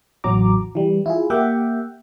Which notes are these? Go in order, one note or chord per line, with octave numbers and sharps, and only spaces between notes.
A1 E2 F#3 A#5 D6
E3 G3
E4 F4 G#4
A#3 G4 E5 F#5 G5